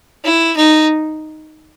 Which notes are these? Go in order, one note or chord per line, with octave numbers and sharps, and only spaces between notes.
E4
D#4